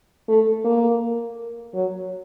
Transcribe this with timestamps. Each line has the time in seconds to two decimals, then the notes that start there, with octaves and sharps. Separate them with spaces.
0.28 A3
0.65 A#3
1.74 F#3